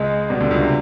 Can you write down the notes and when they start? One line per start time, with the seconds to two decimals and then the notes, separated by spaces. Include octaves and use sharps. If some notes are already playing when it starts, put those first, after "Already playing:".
Already playing: C#2 C#3 G#3
0.30 B2 G3
0.40 D2 D3
0.50 C#2 C#3
0.61 C3